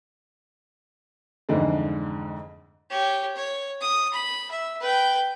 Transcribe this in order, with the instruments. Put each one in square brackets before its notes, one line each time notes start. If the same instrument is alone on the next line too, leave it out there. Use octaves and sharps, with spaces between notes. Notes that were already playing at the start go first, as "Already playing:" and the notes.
[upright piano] F2 G#2 D3 E3 G#3
[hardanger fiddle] G4 C#5
C#5
D#6
B5
E5
B4 G5